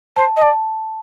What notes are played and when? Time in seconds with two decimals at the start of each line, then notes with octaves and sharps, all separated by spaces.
0.16 C5 A5
0.36 D#5
0.41 D5 A5